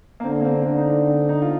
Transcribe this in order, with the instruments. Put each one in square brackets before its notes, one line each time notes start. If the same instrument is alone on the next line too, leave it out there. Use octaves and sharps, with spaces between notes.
[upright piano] A#3
[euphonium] D3 [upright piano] C4
[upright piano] A#3
C4
[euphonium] D3 [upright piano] D4
[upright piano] D#4
D4
C4
D#4
F4